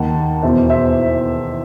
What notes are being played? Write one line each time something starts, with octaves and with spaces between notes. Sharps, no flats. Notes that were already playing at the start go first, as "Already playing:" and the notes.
Already playing: D#2 D#3 F#5 A5
E2 B2 C5 E5
C5 E5